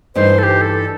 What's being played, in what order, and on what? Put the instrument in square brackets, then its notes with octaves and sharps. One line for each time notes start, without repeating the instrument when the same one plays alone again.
[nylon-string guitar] G2 E3 A3 D#4 [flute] C5
[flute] A4
G4
A4